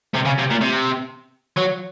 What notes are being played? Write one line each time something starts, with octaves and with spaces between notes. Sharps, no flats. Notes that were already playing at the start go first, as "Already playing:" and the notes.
C3
C#3
C3
A#2
C3
F#3